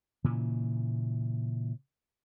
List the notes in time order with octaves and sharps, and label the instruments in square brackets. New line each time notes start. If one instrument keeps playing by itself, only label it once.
[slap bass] A#2 C#3 E3